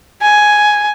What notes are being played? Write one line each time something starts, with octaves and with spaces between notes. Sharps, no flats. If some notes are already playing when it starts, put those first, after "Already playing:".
G#5